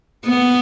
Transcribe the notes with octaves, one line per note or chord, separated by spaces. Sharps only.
B3